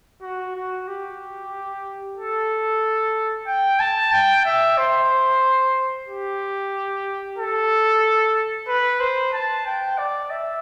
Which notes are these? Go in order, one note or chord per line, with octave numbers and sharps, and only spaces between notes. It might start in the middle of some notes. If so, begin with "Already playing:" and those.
F#4
F#4
G4
A4
G5
A5
G5
E5
C5
G4
A4
B4
C5
A5
G5
D5
E5